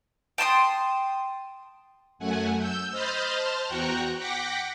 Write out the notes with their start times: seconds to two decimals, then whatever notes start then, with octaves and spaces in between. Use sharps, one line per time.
0.38 G5 A5 C6 D#6
2.19 F#2 A3 F#5 G#5
2.58 E6 G6
2.91 C5 D#5 B5 F6 G6 A6
3.35 C5 A5 C6 F6
3.66 E2 F#4 G5 A#5 C#6 F#6
4.17 F#5 G5 D6 A#6 B6 C#7